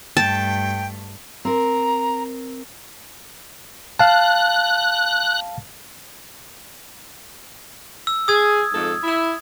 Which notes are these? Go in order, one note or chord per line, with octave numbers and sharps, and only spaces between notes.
G2 A3 G5 A5
C4 A#4 A#5
F5 A5 F#6
E6
G#4 D#6 G#6
F2 G#2 A4
E4